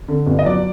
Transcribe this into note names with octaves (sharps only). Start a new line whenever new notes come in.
D3
G1
D#5
F#3 D5